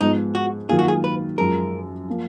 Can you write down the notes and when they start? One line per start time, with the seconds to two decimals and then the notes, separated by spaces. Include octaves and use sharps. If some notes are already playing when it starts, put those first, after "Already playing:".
0.01 G#2 F3 B3 D#4
0.35 F#4
0.69 D#3 F#3 A#3 F4 G#4
0.79 F#4
0.88 G#4
1.04 B4
1.38 F#2 F3 G#3 A#4
2.08 F3 A#3